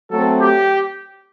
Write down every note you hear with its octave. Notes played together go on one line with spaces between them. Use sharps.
F#3 A3 C4 A4
G4